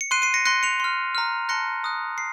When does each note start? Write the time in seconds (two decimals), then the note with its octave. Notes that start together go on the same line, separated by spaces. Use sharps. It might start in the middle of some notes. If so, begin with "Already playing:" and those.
0.01 C#7
0.11 C6 F#6 C7 D#7
0.22 C7 D#7
0.34 A#6 C#7
0.45 C6 F#6 A#6 C#7
0.63 C#7 F7
0.80 C6 F6
1.15 A#5 F6
1.49 A5 C6 F#6 A#6 C#7
1.84 A#5 D#6 F#6
2.18 C7